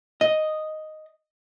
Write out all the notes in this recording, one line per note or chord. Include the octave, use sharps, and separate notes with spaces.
D#5